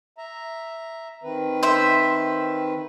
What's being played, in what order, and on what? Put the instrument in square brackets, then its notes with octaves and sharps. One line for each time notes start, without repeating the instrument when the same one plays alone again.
[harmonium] E5 A#5
D#3 C4 B4
[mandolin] C5 E5